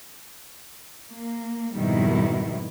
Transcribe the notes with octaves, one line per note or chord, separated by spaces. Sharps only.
A#3
F2 G#2 B2 D#3 G3 E4